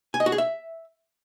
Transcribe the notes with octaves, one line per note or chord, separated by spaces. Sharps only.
G#5
D#5
F#4
G#4
E5